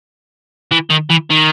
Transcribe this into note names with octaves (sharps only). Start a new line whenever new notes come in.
E3
D#3
E3
D#3